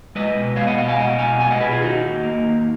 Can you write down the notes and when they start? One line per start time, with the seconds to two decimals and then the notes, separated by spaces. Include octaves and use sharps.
0.15 G#3 B4 D#5
0.36 B2
0.56 B3 C#5 F5
0.67 D#5 F#5
0.77 B2 D#5 F#5
0.88 F5 G#5
0.98 G#3 D#5 F#5
1.19 B2 F5 G#5
1.39 B3 G#5
1.50 D#5 F#5
1.60 B2 G#4 B4
1.71 F4 G#4
1.81 D#3 D#4 F#4
2.02 D#2
2.23 A#3
2.45 D#2